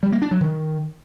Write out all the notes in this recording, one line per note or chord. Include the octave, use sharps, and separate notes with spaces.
G3
A#3
D4
F#3
D#3